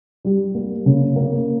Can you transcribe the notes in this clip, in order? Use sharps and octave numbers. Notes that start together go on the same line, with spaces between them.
G3
A#3
C#3
A#3